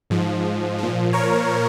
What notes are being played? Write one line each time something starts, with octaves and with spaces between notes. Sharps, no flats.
G#2 F3
A#2 F3
A#4 C#5